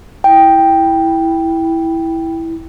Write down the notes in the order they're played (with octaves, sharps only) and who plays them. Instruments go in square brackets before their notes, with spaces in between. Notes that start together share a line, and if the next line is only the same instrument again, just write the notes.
[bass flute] E4 [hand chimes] G5